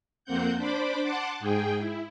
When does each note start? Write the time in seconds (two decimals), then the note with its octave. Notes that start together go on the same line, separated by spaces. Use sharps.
0.25 F2 A#3 C4 F#5 G6
0.56 D4 C5 B5 D6
1.03 F#5 A5 C6 D6
1.40 G#2 G#4 G5
1.79 E4